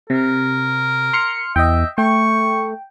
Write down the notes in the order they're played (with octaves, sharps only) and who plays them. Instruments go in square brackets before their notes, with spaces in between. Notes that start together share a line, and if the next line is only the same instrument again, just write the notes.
[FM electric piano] C3 [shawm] A#4
[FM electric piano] C6 F6 C#7
[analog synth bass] E2 [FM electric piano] D#5 G5 [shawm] E5
[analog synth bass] A3 [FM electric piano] G5 [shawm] C#6